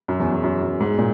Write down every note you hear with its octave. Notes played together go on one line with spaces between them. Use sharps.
F#2
E2
E2
F#2
F#2
G#2
A#2